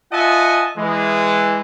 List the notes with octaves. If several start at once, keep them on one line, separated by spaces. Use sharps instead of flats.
F4 D#5 E5 F#5 G#5 A5
E3 G#3